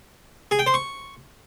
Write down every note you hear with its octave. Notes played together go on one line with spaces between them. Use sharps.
G#4
G5
C5
C#6